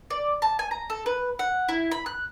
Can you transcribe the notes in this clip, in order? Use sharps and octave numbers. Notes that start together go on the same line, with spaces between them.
D5
A5
G#5
A#5
A4
B4
F#5
E4
B5
F#6